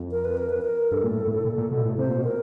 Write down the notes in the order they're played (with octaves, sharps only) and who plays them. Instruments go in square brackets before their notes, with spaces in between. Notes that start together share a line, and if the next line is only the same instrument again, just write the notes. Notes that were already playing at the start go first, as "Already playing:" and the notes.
Already playing: [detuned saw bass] F2
[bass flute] A#4
B4
A#4
B4
A#4
[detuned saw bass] G2 [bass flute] A4
[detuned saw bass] A#2
A2
A2
A#2
A#2
B2
A2
[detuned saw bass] C3 [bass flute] C5
[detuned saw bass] A#2
B2
[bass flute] A#4